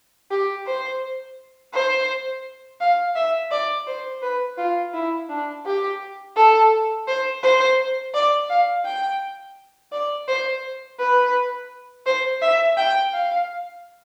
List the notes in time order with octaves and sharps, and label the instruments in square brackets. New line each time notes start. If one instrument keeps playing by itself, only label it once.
[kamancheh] G4
C5
C5
F5
E5
D5
C5
B4
F4
E4
D4
G4
A4
C5
C5
D5
F5
G5
D5
C5
B4
C5
E5
G5
F5